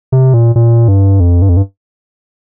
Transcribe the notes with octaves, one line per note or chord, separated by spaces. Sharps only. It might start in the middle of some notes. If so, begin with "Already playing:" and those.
C3
A#2
A#2
G2
F2
G2
F2
G2